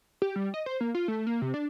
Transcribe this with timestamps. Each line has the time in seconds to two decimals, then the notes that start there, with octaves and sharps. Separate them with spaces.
0.22 G4
0.36 G3
0.54 D#5
0.66 C5
0.81 A#3
0.95 F4
1.08 A3
1.27 A#3
1.42 C3
1.54 D4